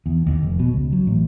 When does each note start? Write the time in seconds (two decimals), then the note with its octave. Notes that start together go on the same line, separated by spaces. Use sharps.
0.06 E2
0.26 D#2
0.43 F1
0.59 B2
0.73 C#2
0.92 F#3
1.07 A1